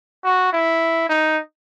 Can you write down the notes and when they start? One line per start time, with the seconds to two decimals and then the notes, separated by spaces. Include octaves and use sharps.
0.24 F#4
0.53 E4
1.09 D#4